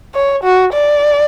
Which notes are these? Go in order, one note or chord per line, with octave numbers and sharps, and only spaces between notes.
C#5
F#4
D5